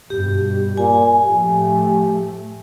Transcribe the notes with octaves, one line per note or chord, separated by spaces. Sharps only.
G2 B2 G4
A#2 G#5
A2 F3 A3 G4